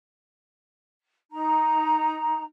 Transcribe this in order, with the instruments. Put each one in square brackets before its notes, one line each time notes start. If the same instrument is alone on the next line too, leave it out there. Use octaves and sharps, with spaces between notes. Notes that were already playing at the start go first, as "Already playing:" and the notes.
[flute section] D#4 A#5